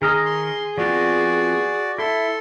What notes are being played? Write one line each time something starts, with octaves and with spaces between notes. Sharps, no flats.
D#3 G#4 A#4 D#5
C6
F3 B3 C4 F#4 D5
E4 A4 C6